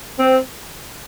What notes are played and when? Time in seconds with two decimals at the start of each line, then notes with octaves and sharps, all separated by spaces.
0.19 C4